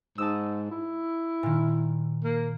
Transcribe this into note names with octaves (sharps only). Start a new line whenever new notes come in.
G#2 A5 D#6 E6
E4
A#2 D#3
A#3